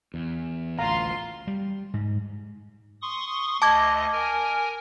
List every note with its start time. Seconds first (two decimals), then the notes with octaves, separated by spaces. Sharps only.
0.14 E2
0.79 A1 D2 F4 F5 A#5 C6
1.47 G3
1.94 G#2
3.02 C6 C#6 D#6
3.62 D2 D#5 A5 D6 G#6
4.12 A#4 G#5